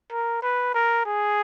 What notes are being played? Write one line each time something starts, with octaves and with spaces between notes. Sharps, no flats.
A#4
B4
A#4
G#4